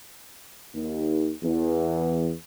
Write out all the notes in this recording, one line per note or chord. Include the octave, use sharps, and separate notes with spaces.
D#2
E2